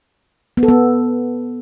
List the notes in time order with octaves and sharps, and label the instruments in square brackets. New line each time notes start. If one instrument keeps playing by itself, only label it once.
[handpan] B3
A4
B3